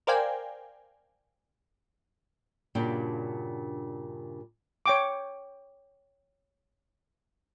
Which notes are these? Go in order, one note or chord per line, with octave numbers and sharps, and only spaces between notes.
A#4 C5 D5 F5 G5 G#5
G2 A#2 C#3 D4 F#4 G5
C#5 G5 D6